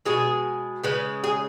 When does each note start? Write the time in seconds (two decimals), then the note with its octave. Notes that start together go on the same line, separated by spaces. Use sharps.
0.05 B2 G#3 G#4
0.83 C#3 G#3 B4
1.24 G#4